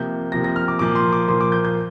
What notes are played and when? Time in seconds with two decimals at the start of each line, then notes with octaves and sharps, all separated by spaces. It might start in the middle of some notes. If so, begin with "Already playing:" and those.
Already playing: C3 F3 A#3 G6
0.32 C3 F3 A#3 A#6
0.44 A#6
0.56 F6
0.68 D6
0.79 A#2 F3 A#3 D6
0.95 C6
1.13 D6
1.28 A#2 F3 A#3 C6
1.41 D6
1.52 G6
1.65 G6